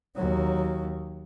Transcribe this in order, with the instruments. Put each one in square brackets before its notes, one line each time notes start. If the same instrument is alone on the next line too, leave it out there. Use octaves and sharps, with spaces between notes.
[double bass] D#2 F#3